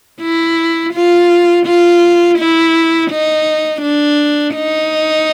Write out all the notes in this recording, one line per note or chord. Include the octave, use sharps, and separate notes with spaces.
E4
F4
F4
E4
D#4
D4
D#4